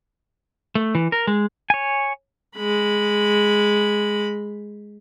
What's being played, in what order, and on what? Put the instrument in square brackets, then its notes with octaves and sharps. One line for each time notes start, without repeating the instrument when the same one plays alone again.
[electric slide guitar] A3
E3
A#4
G#3
[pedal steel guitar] C#5 G#5
[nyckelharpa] G#3 B5